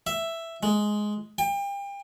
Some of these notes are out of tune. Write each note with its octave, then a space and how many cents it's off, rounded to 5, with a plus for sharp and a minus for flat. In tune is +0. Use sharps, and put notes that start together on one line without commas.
E5 +5
G#3 +10
G5 +35